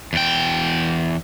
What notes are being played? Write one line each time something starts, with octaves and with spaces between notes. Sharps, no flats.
E2 G5